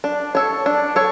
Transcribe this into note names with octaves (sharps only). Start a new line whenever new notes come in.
D4
A4 C#5
D4
A4 C#5